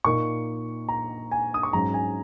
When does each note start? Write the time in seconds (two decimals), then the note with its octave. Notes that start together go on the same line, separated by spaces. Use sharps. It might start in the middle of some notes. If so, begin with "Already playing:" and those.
0.05 A#2 A#3 D#4 C#6
0.89 A#5
1.31 G#5
1.54 D#6
1.63 C#6
1.73 G#2 F#3 C#4 A#5
1.94 G#5